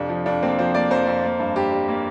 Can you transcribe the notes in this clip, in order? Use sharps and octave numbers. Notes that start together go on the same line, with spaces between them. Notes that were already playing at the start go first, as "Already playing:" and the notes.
Already playing: F2 C3 D4
F3
F2 D4
A#3 C4
F3 C5
A#3 D5
F2 C5
F2
A#3
G2
G2 G4
G3
A#3